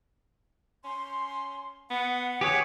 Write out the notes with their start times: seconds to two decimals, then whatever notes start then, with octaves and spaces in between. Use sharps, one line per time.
0.84 C#4 C6
1.90 B3 F#5
2.41 G4 G#4 B4 C#5